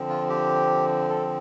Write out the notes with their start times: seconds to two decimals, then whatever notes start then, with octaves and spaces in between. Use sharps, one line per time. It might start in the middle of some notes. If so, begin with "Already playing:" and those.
Already playing: D3 F3 C4
0.09 F4
0.29 G4
1.09 A4